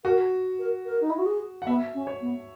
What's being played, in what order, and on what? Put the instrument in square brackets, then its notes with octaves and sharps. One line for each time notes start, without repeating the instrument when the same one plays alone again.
[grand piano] F#4 [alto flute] A#4
[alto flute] A#4
A#4
D#4
E4
F#4
G#4
[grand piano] F#5
[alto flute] B3 [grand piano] E5
[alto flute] C#4
[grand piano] C#5
[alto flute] B3